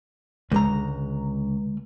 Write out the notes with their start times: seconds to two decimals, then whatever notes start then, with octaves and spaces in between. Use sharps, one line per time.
0.52 C#2 D3 G#3 A#5